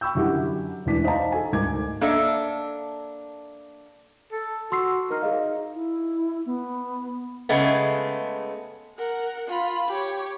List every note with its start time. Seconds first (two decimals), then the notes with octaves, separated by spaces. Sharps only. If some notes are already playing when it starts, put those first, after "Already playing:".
0.01 G5 B5 C#6 E6 G6
0.15 F#2 D3 E4 G4 F#5
0.86 E1 D2 E3 D4 B6
1.04 D#4 C5 D#5 F5 A5 A#5
1.32 A4 G#5
1.52 D2 G#2 A#4 D6 G#6
2.01 A#3 D4 A4 D#5 E5
4.32 A4
4.72 F#4 C6 E6 C7
5.10 D#4 A#4 F6
5.22 G#4 D#5 F5
5.75 E4
6.46 B3
7.49 C#3 G#3 A3 B3
8.98 A#4 F#5
9.48 F4 B5
9.88 G4 C#5